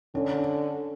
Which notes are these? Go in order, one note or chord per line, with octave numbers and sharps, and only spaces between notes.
D3 C#4